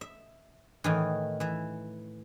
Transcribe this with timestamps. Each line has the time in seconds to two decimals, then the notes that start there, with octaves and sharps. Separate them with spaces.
0.01 E5
0.84 A2 D#3 E3
1.40 E3 E5